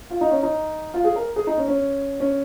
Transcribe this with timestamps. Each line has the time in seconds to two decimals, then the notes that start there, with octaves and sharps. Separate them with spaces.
0.10 F4
0.21 D#4
0.31 C#4
0.43 D#4
0.94 F4
1.04 G#4
1.15 A#4
1.36 G#4
1.47 D#4
1.57 C#4
1.68 C#4
2.20 C#4